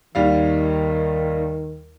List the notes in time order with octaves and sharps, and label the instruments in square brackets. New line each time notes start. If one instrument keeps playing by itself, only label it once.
[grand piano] D#2 G3 F5 [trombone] D#3